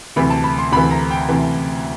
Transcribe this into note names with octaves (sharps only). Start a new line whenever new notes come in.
D2 C3 E3 B5
A5
B5
C6
D2 C3 E3 B5
A#5
G5
D2 C3 E3